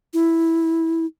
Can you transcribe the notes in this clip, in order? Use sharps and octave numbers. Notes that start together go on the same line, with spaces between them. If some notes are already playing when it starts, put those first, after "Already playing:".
E4